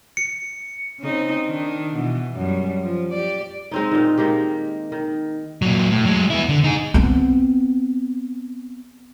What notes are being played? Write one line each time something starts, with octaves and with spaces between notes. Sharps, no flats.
C#7
C#3 C4 D#4
D#3 D4
B2 E3
F#2 G3
F3
G4 D5
G#3 C4 D#4
A#2 D#3
D#3 G#3 A#3 G4
D#3
A#2 F#3
A2
F#3 G#3
B3 E4
D3
D#4 G#4
B3 C4